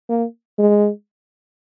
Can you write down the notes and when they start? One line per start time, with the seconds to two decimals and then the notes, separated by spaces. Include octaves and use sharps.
0.09 A#3
0.59 G#3